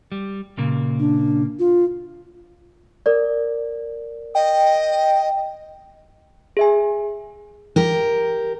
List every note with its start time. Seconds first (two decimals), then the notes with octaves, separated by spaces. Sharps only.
0.12 G3
0.58 A#2 C#3 A#3
0.99 D4
1.59 F4
3.06 A#4 D5
4.35 D#5 G5
6.57 G#4 E5 G#5
7.76 G4 A#4